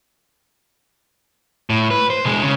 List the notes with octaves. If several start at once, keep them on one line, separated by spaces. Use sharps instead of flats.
A2
B4
C5
B2 G#3
C#3